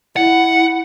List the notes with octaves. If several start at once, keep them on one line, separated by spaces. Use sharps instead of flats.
E4 F#5